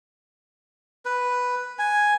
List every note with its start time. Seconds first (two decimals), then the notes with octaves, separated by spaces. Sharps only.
1.05 B4
1.79 G#5